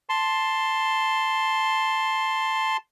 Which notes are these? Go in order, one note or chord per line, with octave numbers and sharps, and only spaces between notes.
A5 C6